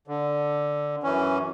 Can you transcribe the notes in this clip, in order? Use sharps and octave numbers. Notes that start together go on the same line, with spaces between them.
D3
F#2 E3 C#4